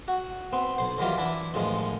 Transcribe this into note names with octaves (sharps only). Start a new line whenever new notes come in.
F#4
B3 C4
B1 C5
D#3 E3 F#3 G3 F4
E3 D4 E4
A1 F#2 D#3 F3 G#3